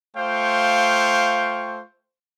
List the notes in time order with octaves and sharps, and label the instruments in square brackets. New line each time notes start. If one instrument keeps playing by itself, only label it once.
[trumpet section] A3 F4 C5 F5 G5 C#6